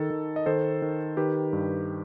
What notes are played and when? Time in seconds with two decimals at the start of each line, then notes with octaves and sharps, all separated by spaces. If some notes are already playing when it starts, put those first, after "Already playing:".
Already playing: D#3 A4
0.10 D#3
0.36 D#5
0.46 D#3 A4 C5
0.82 D#3
1.17 D#3 G4 B4
1.53 G2